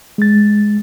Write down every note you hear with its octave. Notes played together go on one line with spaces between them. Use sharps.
G#3 A6